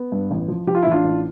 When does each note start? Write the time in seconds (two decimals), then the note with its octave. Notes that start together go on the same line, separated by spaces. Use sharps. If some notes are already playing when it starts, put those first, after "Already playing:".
Already playing: B3
0.12 G2
0.31 A1
0.48 F3
0.67 F3 G4
0.75 F4
0.83 E4
0.86 A1
0.91 D4 F4
1.04 A1